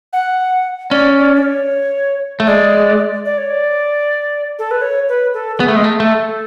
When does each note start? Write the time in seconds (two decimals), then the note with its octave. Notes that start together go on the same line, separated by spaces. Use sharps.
0.13 F#5
0.90 C#4 D5
1.18 D5
1.36 D5
1.43 C#5
2.40 A3
2.47 G#3 D5
3.25 D5
3.38 C#5
3.50 D5
4.59 A4
4.71 B4
4.82 C#5
5.08 B4
5.34 A4
5.57 A4
5.60 B3 G#4
5.68 A3
5.76 G#3
5.84 A3
5.99 A3 A4